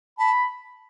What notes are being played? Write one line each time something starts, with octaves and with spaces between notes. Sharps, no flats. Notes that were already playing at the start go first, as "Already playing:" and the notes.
A5 B5